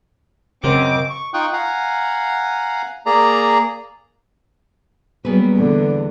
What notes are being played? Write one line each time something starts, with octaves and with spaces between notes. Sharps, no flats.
F#2 C#3 C4 A#4 D#5 D6
C#6
D#4 F4 G5 C#6 D#6 F#6
F5 F#5 G#5 A#5
A#3 G#4 D5 A#5
F#3 G3 A#3 B3 G#4 B4
E2 D3